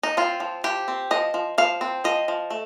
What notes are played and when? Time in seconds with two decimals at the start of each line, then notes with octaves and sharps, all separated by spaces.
0.03 D#4
0.17 C4 F4
0.40 F3
0.64 F3 G4
0.88 C4
1.11 F3 D#5
1.34 F3
1.58 F3 F5
1.81 C4
2.04 F3 D#5
2.28 F3
2.51 A3